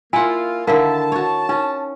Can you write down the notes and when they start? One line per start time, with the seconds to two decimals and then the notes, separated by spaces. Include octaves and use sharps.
0.13 A#3 E4 F4 F#5 G#5
0.67 D3 D#3 E4 A#4 F5 A5
1.12 F#4 C#5
1.49 C#4 D#4